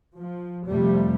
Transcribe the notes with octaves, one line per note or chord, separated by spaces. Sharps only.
F3
F2 C3 G3 A3